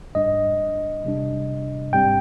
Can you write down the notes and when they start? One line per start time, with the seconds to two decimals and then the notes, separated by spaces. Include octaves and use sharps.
0.15 G#2 G3 D4 D#5
1.04 C3 G3 D4
1.93 G#2 G3 C4 G5